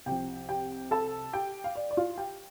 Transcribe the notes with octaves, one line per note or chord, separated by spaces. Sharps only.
C2 C3 F3 G4 G5
G4 G5
A4 A5
G4 G5
F5
D5
D5
F4 F5
G4 G5